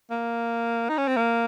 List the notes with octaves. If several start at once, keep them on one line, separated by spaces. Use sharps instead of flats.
A#3
D#4
C#4
C4
A#3